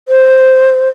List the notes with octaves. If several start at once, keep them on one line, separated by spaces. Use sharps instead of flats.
C5